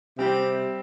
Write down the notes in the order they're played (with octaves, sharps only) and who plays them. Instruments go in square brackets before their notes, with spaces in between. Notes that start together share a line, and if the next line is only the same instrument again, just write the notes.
[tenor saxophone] C3 [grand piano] G3 C4 G4